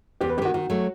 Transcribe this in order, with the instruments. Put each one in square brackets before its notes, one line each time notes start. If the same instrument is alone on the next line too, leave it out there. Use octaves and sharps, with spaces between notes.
[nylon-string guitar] E2 [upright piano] G4
[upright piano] B4
[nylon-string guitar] F#3 [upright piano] G4
[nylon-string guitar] D#3 [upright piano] F#4
[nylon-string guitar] D#3 [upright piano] F#4
[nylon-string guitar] F#3 A3